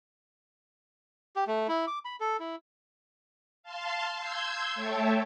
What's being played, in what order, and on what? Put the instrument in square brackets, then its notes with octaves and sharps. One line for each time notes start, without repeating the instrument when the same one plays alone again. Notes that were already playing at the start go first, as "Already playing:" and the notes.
[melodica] G4
A3
E4
D6
B5
A4
E4
[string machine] F5 A5 C6
C6 E6 G6 G#6
A3 C#5 E5 G5 A5